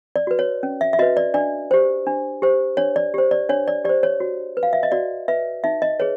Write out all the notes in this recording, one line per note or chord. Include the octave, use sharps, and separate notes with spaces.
D5
F#4 B4
C#5
C#4
E5
E5
F#4 B4 D#5
D5
D4 D5
G4 C5
D4
G4 C5
D4 C#5
D5
G4 C5
D5
D4 C#5
D5
G4 C5 D5
C#5
F#4
B4
F5
E5
D#5
F#4 D5
B4 E5
D#4 E5
D#5
G#4 B4 C#5